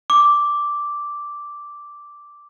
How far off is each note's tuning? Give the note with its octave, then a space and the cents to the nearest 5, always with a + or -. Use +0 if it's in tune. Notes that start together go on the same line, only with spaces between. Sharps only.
D6 -5